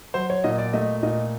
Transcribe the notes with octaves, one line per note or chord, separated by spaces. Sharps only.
F#3 C5
C#5
A#2 D#5
D5
A3 D#5
A#2 D#5